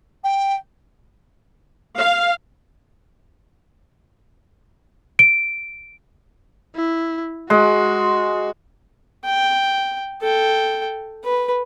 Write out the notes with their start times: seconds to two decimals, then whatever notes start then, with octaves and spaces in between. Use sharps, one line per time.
0.24 G5
1.98 F5
5.19 D7
6.76 E4
7.50 G#3 F#4
9.25 G5
10.22 A4 G5
11.24 B4